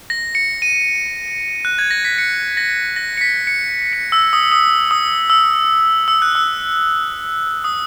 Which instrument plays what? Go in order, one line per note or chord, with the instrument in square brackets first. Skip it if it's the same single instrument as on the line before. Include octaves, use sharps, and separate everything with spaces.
[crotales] A#6
C#7
D#7
F#6
G#6
A#6
B6
C#7
A#6
A#6
C#7
B6
C#7
C#7
E6
D#6
D#6
D#6
E6
E6
F#6
E6
D#6